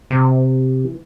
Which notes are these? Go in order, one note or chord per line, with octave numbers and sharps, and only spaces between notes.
C3
E3